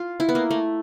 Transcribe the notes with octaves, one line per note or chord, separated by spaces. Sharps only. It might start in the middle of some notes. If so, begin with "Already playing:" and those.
Already playing: F4
E4
B3
A#3
A3